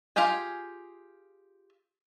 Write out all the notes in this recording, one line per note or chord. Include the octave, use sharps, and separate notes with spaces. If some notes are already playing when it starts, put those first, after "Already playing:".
F4 G4 G#4 G5 G#5